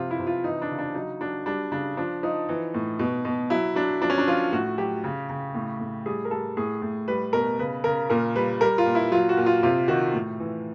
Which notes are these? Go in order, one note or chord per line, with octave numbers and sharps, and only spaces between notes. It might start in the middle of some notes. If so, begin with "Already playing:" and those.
Already playing: C3 F3 F4
E4
C3
F4
E3 D#4
D4
C#3
D4
F#3 D#4
F#3 D4
G3 D4
C#3 D4
F3 D4
F3 D#4
E3
A2
B2
B2
F#3 E4
F#3 D4
F3 D4
C#4
D4
F3 F4
A2 F#4
F#3 G4
C#3
C#3
A2
A2
G3 G#4
A#4
G3 A4
A2 G#4
A2
G3 B4
B2 A#4
C#3 B4
C#3 A#4
A#2 A#4
G3 B4
G3 A#4
F4
A#2
E4
F#3 F4
F#4
A#2
F4
C3 F4
D#3 F#4
A2
E3